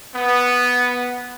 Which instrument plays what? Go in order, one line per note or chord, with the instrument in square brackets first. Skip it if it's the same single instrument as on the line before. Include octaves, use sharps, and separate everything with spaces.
[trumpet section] B3